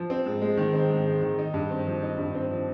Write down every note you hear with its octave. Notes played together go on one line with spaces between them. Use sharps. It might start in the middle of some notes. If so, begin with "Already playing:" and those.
Already playing: F3
C4
G#2
G#3
D#3
C4
G#2
G#3
D#3
D#4
G2
C4
F3
D#4
G2
C4
F3